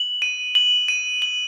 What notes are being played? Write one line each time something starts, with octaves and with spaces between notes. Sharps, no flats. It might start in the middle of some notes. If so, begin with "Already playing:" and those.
Already playing: F#7
D#7
F#7
D#7
F#7